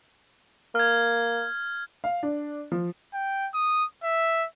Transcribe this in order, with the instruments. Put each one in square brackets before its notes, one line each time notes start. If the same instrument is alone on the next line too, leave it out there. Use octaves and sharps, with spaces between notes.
[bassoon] A#3 [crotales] F6 G#6
[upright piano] F5
D4
F3
[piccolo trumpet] G5
D#6
E5